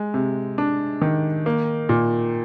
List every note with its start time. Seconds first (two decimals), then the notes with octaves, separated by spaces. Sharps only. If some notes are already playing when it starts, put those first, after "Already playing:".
Already playing: G#3
0.14 C3
0.58 D4
1.02 D#3
1.46 A#3
1.89 A#2